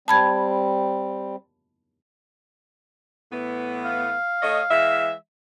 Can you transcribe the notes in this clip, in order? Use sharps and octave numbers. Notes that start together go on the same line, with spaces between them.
G3 C4 A5 B5 G#6
A2 E3 B3
F5
A3 C#5 D#5
E3 G#3 E5